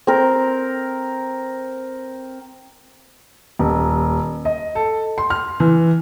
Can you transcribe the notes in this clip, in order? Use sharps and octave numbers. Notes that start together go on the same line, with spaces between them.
C4 A#4
D#1
D#5
A4
C6
F6
E3